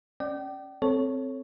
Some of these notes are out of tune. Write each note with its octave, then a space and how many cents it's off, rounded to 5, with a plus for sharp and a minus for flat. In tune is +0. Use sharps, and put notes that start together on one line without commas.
C#4 +0 D5 +20 G5 -35
C4 +0 A4 +0 C#5 -5